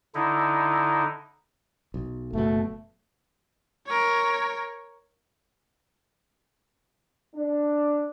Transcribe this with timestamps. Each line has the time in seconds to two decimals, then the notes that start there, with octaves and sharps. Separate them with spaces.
0.15 D3 D#4 E4
1.94 B1
2.33 F#1 B2 A3
3.86 A#4 C#5
7.35 D4